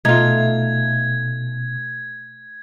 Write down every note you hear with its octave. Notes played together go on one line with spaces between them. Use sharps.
B2 A3 D#4 F4 G#6